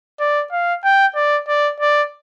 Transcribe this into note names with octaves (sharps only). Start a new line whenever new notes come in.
D5
F5
G5
D5
D5
D5